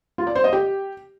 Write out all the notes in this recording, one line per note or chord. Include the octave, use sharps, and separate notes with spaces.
F4
D5
C5
D#5
G4